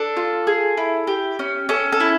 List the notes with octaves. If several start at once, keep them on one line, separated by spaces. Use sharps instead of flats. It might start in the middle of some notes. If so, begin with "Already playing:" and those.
Already playing: D4 A4
F4
G#4
E4
G4
C#4
C#4 A4
A4
E4